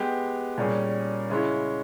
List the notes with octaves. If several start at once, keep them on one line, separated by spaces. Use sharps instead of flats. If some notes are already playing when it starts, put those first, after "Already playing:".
Already playing: G#3 B3 G4
A#2 G3 C#4 G#4
C#3 G#3 C#4 E4